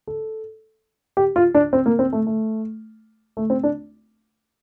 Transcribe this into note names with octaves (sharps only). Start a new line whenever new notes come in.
A4
G4
F4
D4
C4
A#3
C4
A3
A3
A3
C4
D4